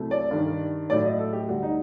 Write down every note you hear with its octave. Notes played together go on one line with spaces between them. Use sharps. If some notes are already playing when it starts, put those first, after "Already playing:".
Already playing: C2 C3 F#3 A3
D5
G2 D#3 G3
A2 F#3 A3 D5
D#5
A4
G4
D2 D3 G3 F#4
D#4